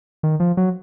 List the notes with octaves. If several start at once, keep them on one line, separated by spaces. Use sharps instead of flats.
D#3
F3
F#3